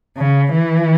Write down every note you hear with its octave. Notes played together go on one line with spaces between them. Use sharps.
C#3
E3